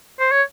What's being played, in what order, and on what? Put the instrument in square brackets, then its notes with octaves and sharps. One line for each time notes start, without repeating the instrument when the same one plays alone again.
[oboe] C5
C#5